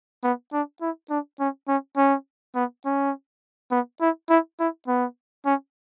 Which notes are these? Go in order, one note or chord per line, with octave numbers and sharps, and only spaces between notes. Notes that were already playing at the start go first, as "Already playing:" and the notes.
B3
D4
E4
D4
C#4
C#4
C#4
B3
C#4
B3
E4
E4
E4
B3
C#4